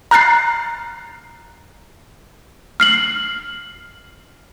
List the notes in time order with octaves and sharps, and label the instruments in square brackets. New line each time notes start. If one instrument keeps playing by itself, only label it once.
[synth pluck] A#5 F6 F#6 A6 C7
[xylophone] F6 C7 F#7